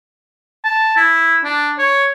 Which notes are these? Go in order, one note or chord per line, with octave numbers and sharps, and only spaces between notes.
A5
E4
D4
C#5